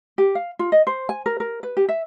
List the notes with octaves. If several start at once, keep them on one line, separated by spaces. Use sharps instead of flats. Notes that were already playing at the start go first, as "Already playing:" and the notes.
G4
F5
F4
D#5
C5
G#5
A#4
A#4
B4
G4
E5